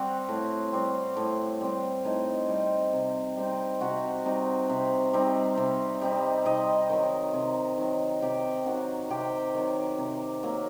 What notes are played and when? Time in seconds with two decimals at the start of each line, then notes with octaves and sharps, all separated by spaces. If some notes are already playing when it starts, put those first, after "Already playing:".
Already playing: G3 C4 F#4 F#5
0.29 A2
0.73 G3 C4
1.17 A2
1.61 G3 C4
2.05 A2 D#4 D#5
2.49 G3 C4
2.93 C3
3.37 G3 C4 D#4
3.81 C3 F#4 F#5
4.26 G3 C4 D#4
4.70 C3
5.13 G3 C4 D#4
5.57 C3
6.01 G3 C4 D#4
6.45 C3 D#4 D#5
6.90 D#3 F#3
7.34 C3
7.78 D#3 F#3
8.22 C3 G4 G5
8.66 D#3 F#3 F#4 F#5
9.10 C3 G4 G5
9.54 D#3 F#3
9.98 C3
10.43 F#3 A#3